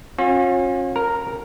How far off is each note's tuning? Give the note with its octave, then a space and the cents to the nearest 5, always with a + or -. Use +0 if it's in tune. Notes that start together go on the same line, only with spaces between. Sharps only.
C#4 -35 F4 +40
A#4 +0 A#5 +0